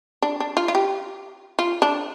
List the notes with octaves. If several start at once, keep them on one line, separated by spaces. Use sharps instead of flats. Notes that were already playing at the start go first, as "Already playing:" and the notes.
D4
D4
F4
F4
G4
F4
D4